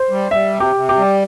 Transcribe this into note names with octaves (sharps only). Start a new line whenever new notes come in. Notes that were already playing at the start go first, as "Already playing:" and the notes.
Already playing: C5
G3
G3 E5
C3
G4
C3
G4
G3